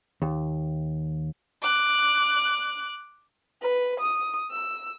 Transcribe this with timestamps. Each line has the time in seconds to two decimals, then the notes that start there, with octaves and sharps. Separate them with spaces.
0.22 D#2
1.62 D6 F#6
3.61 B4
4.00 D#6
4.51 E6